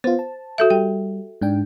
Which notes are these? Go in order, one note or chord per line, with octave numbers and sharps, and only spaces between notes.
B3 F4 C5
A5
F#4 A4 E5
G3 G5
G#2 D4 G5